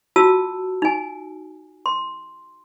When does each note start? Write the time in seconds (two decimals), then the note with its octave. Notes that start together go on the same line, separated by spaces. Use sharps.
0.16 F4 F#4 A5 E6
0.82 D#4 G#5
1.86 C6